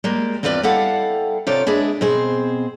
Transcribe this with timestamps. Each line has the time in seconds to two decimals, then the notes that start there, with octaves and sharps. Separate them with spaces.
0.04 G3 G#3 A#3
0.43 E2 C4 F4 B4 D5
0.63 G3 E4 A4 F5 F#5
1.47 C3 F4 G4 A4 C#5 D5
1.67 G#3 D4 G#4 B4 E5
2.01 B2 C4 G#4 C5